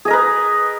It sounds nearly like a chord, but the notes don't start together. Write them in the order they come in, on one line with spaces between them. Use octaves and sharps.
G#4 D#5 A#4 B4